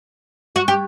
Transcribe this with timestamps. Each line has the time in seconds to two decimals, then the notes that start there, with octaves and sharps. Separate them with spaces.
0.56 F#4
0.68 G4